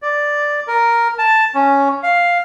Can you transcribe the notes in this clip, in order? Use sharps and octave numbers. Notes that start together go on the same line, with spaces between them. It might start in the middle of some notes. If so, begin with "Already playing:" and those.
D5
A#4
A5
C#4
F5